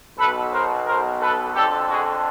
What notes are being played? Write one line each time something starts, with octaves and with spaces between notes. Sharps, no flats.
B1 B2 A4 B4
A#4 C5
A#4 C5
A4 B4
F2 D3 G4 A4
F#4 G#4